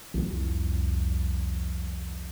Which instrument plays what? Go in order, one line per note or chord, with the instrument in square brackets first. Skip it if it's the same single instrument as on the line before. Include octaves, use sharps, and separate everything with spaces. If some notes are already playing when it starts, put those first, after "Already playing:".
[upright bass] C2 F2